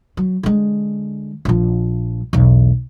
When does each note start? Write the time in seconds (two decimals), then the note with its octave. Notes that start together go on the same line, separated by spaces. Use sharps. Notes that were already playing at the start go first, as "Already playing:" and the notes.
0.17 F#3
0.43 D3 G#3
1.45 A#1 F3
2.33 B1 E2